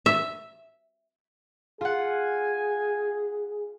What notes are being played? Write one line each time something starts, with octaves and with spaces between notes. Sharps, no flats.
E5
F4 G#4 F#5 G#5